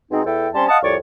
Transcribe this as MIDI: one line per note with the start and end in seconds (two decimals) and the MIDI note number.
0.11 0.23 47
0.11 0.23 56
0.11 0.23 60
0.11 0.23 63
0.25 0.48 40
0.25 0.48 64
0.25 0.48 69
0.25 0.48 79
0.54 0.66 55
0.54 0.66 60
0.54 0.66 61
0.54 0.66 81
0.54 0.66 84
0.68 0.77 75
0.68 0.77 77
0.68 0.77 78
0.68 0.77 81
0.68 0.77 87
0.83 0.95 36
0.83 0.95 41
0.83 0.95 73
0.83 0.95 74
0.83 0.95 85